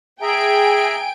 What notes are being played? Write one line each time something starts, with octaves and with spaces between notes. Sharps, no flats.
G#4 E5 G5 G#5 A#5 D7